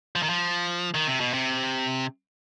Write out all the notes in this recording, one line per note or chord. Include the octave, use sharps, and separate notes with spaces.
F3
D#3
F3
D#3
C3
B2
C3